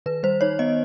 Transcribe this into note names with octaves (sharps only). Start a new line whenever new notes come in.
D#3 B4
G3 C5
D#4 C#5
B3 D#5